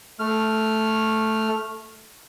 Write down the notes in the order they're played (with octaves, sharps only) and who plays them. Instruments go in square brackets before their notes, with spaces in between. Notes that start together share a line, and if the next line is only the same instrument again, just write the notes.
[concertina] A3 F6